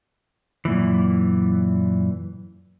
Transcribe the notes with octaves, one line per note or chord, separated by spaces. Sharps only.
F#2 A#2 E3